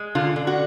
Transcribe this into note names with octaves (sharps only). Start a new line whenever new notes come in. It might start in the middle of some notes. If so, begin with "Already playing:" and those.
Already playing: G#3
D3 F4
D3
F#4